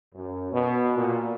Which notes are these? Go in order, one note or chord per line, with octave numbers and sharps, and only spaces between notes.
F#2
B2
A#2